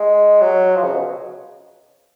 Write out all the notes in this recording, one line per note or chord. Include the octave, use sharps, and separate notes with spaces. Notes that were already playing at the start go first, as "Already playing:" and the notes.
Already playing: G#3
F#3
F3
C#3
B2